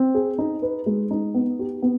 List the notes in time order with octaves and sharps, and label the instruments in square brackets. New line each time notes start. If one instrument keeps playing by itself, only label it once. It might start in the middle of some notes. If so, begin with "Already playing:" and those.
Already playing: [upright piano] C4
G#4
D#4
B4
G#3
D#4
B3
G4
B3